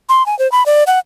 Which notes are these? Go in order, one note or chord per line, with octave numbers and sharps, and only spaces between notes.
C6
G#5
C5
B5
D5
F#5